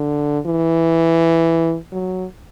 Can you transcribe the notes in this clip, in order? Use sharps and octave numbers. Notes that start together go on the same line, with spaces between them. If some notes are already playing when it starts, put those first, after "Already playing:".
Already playing: D3
E3
F#3